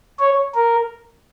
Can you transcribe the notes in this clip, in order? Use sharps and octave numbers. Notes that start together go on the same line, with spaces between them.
C#5
A#4